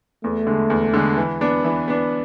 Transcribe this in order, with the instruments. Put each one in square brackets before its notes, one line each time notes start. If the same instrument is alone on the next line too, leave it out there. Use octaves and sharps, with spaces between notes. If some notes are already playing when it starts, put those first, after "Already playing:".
[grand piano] E2 [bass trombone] A3
[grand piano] D3 G#3
E2
D3 G#3
E3
B3 D4
E3
B3 D4